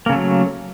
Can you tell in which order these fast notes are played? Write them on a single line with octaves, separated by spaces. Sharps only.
A#3 C#3 A3 F#3